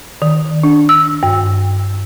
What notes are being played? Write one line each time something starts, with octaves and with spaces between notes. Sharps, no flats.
D#3
D4
E6
G2